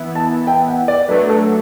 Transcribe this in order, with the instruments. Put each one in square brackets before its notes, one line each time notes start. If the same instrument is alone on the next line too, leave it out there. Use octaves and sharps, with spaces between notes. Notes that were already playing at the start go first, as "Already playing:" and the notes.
Already playing: [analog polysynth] E3 B3 E4
[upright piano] A5
G5
F#5
D5
[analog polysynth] F#3 A3 D4 [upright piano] B4
[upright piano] A4